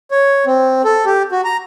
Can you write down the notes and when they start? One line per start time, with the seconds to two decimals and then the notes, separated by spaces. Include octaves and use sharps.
0.11 C#5
0.46 C4
0.85 A4
1.05 G4
1.32 F#4
1.44 A#5